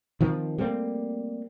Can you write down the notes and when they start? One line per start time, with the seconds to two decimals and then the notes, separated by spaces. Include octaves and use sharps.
0.21 D#3 F3 C4
0.58 G3 A3 A#3 C4